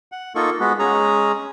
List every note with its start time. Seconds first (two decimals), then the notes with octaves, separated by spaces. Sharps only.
0.12 F#5
0.35 A#3 D#4 F4 A4 C#6
0.60 G#3 B3 F#4
0.79 G#3 C#4 G#4 A#5